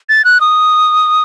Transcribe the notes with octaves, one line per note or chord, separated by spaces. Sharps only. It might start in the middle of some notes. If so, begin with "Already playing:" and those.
A6
F#6
D#6